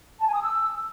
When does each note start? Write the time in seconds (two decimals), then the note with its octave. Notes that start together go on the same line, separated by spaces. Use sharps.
0.20 A5
0.27 G#5
0.34 D#6
0.42 E6